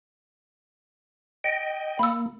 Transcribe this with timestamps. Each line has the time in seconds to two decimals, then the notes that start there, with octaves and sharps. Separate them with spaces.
1.44 D#5 G5
1.99 A#3 B5 E6